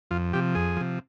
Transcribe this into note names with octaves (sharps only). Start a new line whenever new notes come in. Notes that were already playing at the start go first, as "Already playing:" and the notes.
F2 F4
C3 F3 G4
F2 G#4
C3 F3